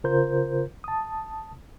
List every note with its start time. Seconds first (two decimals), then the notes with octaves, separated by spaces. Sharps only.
0.04 C#3 F4 A#4 C5 G6
0.84 A5 D#6